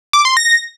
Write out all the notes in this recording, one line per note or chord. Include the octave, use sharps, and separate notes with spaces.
D6
C6
A#6